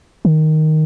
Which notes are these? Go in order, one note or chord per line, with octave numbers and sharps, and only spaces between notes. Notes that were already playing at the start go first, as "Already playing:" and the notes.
D#3